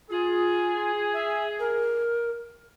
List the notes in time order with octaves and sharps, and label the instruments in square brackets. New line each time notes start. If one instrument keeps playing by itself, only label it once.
[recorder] F4 [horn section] G#4
[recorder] E5
A#4